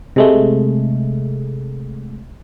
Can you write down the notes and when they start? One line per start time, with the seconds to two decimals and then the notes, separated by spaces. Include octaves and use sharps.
0.16 C3 G#3 A3